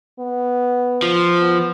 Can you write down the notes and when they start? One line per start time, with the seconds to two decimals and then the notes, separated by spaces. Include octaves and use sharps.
0.19 B3
1.02 F3
1.40 B3